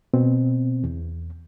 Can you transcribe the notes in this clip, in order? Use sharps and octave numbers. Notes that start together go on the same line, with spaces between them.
B2 C4
E2